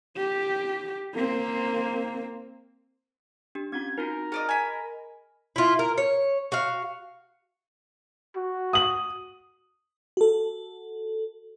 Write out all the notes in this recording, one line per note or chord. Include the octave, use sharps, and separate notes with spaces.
G4
A#3 C4
D4 G4
C4 C#4 F4 G#6
D#4 F4 F#4 A#4
F4 G#4 D5 D#5
D#5 G#5 B5
E4 F4
A#4
C#5
F#4 F5
F#4
D#6 F#7
F#4 A4